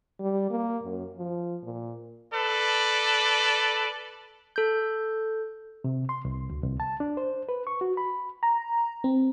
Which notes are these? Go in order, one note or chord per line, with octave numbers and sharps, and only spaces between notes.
G3
A#3
F#2
F3
A#2
A4 B4 D5
A4 G6
C3
C6
C2
D2
C2
A5
D4
C5
B4
C#6
F#4
B5
A#5
C4